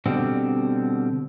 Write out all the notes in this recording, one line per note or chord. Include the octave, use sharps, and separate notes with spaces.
B2 D3 G3 C4